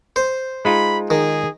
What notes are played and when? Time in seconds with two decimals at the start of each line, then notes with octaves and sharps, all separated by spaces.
0.16 C5
0.65 G#3 D#4 F4 B5
1.10 D#3 G#4